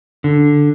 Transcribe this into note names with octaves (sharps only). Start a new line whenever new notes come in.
D3